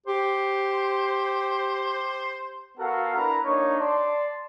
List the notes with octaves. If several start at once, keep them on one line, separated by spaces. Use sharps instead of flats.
G4 C5
B3 F#4 A4 A#4 F5 F#5
D4 E4 A#4 B4 A#5
A#3 D4 D#4 C#5
D5 A5 C6